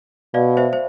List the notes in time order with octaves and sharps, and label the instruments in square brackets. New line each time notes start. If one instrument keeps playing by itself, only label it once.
[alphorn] B2 [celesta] D5 F5
[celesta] C5 E5
C5